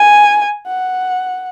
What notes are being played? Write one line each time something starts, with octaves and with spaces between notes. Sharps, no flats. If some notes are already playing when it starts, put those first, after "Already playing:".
Already playing: G#5
F#5